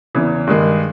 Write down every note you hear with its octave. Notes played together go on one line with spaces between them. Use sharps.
E2 C#3 E3
G2 D#3 G#3